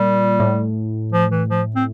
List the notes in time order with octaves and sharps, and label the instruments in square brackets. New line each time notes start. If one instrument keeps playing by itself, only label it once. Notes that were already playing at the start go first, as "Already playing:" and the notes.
Already playing: [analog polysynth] A#2 [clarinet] G3
[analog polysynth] A2
[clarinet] F3
E3
F3
C4